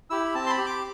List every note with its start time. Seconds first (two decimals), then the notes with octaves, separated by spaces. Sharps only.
0.10 E4 G4 E6
0.25 B5
0.35 C4 A5
0.46 C6
0.50 B5
0.58 G4
0.66 D6